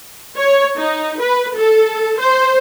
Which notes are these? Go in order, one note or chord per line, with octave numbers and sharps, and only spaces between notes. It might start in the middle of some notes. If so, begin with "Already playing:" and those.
C#5
D#4
B4
A4
C5